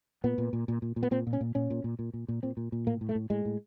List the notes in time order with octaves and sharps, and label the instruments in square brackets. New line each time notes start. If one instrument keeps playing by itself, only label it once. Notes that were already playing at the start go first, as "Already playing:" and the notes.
[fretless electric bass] A#2 B3
A#2
A#2
A#2
A#2
A#2
B3
A#2 C4
A#2
C#4
A#2
A#2 C#4
A#2
A#2
A#2
A#2
A#2
A#2 C4
A#2
A#2
A2 A#3
A2
A3
A2
A2 G#3
A2